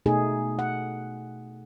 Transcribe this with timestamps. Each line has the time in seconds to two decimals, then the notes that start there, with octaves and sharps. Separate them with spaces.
0.06 B2 A3 D#4 G#4
0.59 F#5